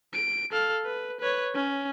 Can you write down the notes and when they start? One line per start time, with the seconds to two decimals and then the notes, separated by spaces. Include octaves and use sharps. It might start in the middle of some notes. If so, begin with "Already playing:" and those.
0.14 D7
0.52 A4 F5
0.85 B4
1.20 B4 C#5
1.54 C#4